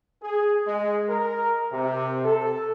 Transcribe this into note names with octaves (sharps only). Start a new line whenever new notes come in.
G#4
G#3
A#4
C3
A4